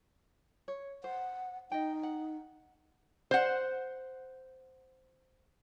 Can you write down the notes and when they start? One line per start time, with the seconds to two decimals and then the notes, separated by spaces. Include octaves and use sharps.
0.68 C#5
1.04 C5 F#5
1.72 D#4 D#5 G5
2.03 F#5
3.31 C5 F#5